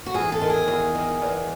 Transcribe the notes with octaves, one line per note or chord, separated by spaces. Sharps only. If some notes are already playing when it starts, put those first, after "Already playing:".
F#4
E2 G#4
A4
D#3
G#4
E2
D#3
E2